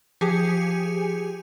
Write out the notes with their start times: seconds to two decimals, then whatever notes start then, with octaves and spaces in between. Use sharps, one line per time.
0.21 F3 G4 G#4 G#5 C#7